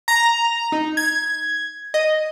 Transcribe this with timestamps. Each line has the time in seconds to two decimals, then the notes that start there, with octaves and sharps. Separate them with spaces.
0.08 A#5
0.72 D#4
0.97 G#6
1.94 D#5